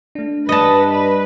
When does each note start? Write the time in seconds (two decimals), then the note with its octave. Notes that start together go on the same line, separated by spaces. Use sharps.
0.15 A3 D4
0.49 G2 B4 D5 D#5 A5 C#7
0.93 B4 D5